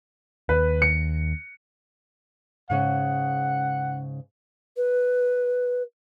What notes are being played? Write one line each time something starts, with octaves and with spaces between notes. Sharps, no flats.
D#2 B4
C#7
G#2 C#3 C#4 F#5
B4